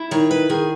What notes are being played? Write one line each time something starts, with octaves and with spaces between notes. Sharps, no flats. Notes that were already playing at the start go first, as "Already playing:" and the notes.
Already playing: E4
D#3 C#5
B4
D#3 G#4